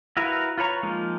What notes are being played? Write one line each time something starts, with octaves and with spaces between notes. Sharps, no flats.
E4 F#4 A#4 B4 F5
F4 B4 C#5 A#5 C#6
F3 G#3 A#3 D#4 F4